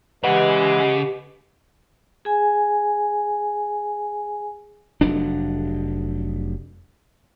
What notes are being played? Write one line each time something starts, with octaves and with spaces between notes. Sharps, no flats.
C#3 E3 G#3 G4 B4 D#5 F#5
G#4 G#5
F1 F#3 D4